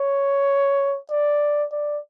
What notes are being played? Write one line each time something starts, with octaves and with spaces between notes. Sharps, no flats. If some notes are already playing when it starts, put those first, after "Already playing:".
Already playing: C#5
D5
D5